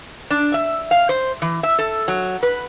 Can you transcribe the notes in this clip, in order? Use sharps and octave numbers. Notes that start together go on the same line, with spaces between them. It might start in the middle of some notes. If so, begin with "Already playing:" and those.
D4
E5
F5
C5
E3
E5
A4
F#3
B4